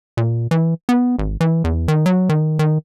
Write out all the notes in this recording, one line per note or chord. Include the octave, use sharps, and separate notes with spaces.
A#2
E3
B3
G#1
E3
E2
D#3
F#3
D#3
D#3